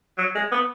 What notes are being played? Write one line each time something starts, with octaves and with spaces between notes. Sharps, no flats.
F#3
G#3
B3